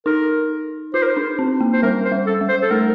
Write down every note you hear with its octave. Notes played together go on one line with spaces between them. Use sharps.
D#4 A#4
F4 C5
A#4
C5
D4
C4
A#3
C5
G3 A#4
C5
G3
A4
G3
C5
A4
A3 A#4